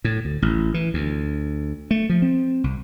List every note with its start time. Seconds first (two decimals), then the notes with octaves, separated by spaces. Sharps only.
0.04 A2
0.25 D2
0.42 A1
0.74 E3
0.94 D2
1.91 A3
2.09 F3
2.22 C4
2.64 C2